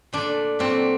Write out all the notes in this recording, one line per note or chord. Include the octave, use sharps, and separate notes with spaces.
A#2 A3 D4
A#2 F#3 A3 C4